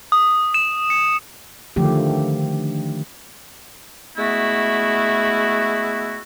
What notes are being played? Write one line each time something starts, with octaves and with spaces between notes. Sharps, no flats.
D#6
E7
C#7
D3 D#3 F3 A3 G4
G#3 A3 B3 E4 F#4